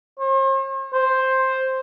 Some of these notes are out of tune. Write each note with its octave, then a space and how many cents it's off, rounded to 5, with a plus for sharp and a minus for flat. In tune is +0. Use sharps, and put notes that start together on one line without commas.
C5 +45
C5 +5